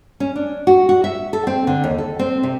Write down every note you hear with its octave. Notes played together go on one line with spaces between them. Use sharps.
C#4
D4
F#4
F#4
E5
A4
C4
D3
D#2
A4
C4
C3